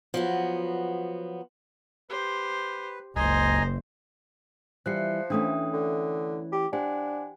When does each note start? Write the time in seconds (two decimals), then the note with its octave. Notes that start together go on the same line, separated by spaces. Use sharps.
0.14 F3 F#3 B3
2.10 G4 B4 C5
3.16 F#1 C#2 C5 D#5 G#5 A#5
4.86 E3 F3 G3 F#6 C7 C#7
5.30 E3 A3 C#4 D4 G5 D#6
5.73 D3
6.52 G4
6.73 D4 G4 C5 F#5 G#5